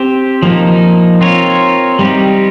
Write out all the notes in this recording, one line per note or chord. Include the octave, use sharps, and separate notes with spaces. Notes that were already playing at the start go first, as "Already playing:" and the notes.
Already playing: C4 G4 C5
F3 A#3 D#4
C4 F4 A#4 C#5
G3 C4 D#4 G4